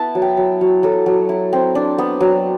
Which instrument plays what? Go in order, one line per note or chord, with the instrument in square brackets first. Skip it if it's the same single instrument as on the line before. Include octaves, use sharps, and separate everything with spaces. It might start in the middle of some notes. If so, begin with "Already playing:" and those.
Already playing: [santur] B3 E4 A5
F#3
G5
F#3
F#3
F#3 A4
F#3
E4
C4
D4
B3
F#3